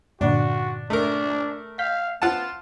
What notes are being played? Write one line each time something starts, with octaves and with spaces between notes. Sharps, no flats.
G2 A#2 D3 D4 F#4
A3 D4 A#4
F5 G6 B6
B3 F4 F#5 A5